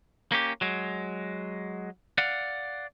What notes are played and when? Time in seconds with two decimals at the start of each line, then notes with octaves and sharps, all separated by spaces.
0.32 A#3 C#4 G4
0.61 F#3 G#3
2.18 D5 F5 F#5